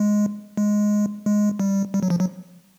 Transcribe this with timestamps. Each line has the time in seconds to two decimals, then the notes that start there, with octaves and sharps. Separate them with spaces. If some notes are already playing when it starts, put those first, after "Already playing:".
Already playing: G#3
0.57 G#3
1.26 G#3
1.60 G3
1.94 G3
2.03 F#3
2.10 F3
2.20 F#3